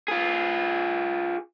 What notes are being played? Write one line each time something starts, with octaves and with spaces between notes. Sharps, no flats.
F4 G#4